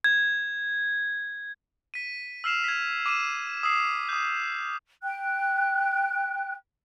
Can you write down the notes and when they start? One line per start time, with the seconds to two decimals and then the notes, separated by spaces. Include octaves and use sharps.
0.04 G#6
1.94 B6 D#7
2.44 E6 F6 C7 E7 F7
2.64 G#6 B6
3.06 D6 D#7 E7
3.63 D#6 E6 C7
4.09 D#6 G6
5.03 G5 F#6